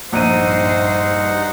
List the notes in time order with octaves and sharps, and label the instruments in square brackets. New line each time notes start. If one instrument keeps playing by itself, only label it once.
[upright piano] A#1 D#7 [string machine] G2 [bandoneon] D#4 F#5 [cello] C5